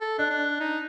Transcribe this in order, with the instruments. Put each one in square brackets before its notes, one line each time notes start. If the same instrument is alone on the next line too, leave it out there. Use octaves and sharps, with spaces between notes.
[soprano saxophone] A4
[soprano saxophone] D4 [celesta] D#5 F#6
[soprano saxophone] D4
D#4